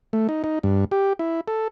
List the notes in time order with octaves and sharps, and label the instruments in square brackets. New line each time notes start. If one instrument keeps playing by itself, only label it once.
[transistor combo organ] A3
D#4
D#4
G2
G4
E4
A4